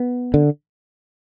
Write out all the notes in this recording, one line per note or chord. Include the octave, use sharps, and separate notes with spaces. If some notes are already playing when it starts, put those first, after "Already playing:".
Already playing: B3
D3